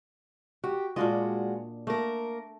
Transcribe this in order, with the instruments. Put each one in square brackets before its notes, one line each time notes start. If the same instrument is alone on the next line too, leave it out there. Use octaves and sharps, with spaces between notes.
[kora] F#4 [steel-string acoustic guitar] G4
[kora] A#2 D4 D#5 [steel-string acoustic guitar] G#3 F4 F#4
[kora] A3 [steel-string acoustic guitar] A#3 A#4